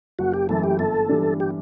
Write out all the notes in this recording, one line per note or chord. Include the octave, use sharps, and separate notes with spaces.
F#1 F#4
G4
F#2 E3 A3 A4
G4
G1 A4
G2 E3 G3 D4
G4